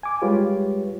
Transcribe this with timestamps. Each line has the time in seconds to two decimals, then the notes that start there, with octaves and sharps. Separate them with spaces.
0.03 G#5 D6
0.22 G3 G#3 F4 G4 B4 C#5